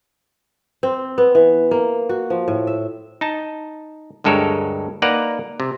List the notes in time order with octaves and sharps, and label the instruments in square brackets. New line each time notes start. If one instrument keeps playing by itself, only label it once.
[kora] C4
B3
E3
A#3
F#4
F3
A2
E5
[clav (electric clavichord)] D#4 A5
D2 G2 G#3 A4 A#4 C#5
A#3 D#4 B4 D5 F#5 A#5
C3